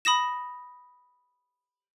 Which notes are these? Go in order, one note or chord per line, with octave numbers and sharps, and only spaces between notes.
B5 D#6 A#6 E7